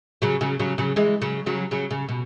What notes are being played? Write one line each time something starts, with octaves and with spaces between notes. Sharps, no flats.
C#3 F#3
C#3 F#3
C#3 F#3
C#3 F#3
E3 G#3
C#3 F#3
C#3 F#3
C#3 F#3
C#3
B2